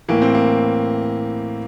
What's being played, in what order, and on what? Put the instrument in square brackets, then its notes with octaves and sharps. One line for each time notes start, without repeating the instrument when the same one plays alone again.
[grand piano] A2 E3 A#3
C4
A#3